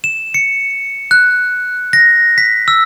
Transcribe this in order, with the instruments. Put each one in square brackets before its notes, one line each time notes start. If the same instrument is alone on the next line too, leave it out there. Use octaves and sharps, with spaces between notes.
[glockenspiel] E7
C#7
F#6
A#6
B6
E6